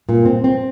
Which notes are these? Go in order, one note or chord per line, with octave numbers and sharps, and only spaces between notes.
A#2
C4
C4